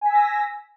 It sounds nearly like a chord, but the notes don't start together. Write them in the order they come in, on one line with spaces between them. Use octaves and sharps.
G#5 B6 E6 A#6